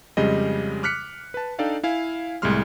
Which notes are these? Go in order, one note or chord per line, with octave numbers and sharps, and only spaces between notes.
F2 C#3 G3 G#3 G4 D#5
D6 F6 F#6 B6 C#7
B4 A5
D4 D#4 A4 D5 F5 G5
E4 F5 G#5
C2 A2 G3 G#3 C6 F6